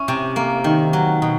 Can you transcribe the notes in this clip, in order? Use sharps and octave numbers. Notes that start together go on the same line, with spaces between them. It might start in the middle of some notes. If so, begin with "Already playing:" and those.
Already playing: C#4 E4
C3
A#3
D#3
F#3
B2